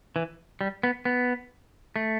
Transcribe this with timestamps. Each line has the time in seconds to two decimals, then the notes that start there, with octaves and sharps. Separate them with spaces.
0.16 E3
0.61 G3
0.83 B3
1.05 B3
1.96 A3